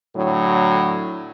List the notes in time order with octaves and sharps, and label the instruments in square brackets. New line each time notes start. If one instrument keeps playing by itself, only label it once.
[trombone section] A2 D3 F#3